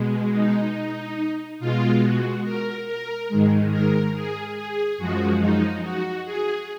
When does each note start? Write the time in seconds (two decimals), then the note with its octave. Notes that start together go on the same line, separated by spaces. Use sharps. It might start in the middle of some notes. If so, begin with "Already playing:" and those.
Already playing: B2 G#3
0.34 D#4
1.60 B2 G#3 F4
2.02 F#4
2.44 A#4
2.87 A#4
3.29 G#2 D#3 G#3
3.71 A#4
4.14 G#4
4.56 G#4
4.98 F#2 F3 G#3 F#4
5.40 D#4
5.83 F#4
6.25 G#4